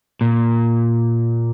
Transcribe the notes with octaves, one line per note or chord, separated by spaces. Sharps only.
A#2